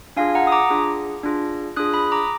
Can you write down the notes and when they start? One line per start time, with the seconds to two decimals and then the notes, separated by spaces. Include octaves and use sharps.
0.16 D4 F4 G#4 F5 G#5
0.35 F#5 A#5
0.47 D#6
0.52 A#5 D6
0.70 D4 F4 G#4
1.23 D4 F4 G#4
1.76 D4 F4 G#4 D#6 F#6
1.94 B5 D#6
2.12 A#5 D6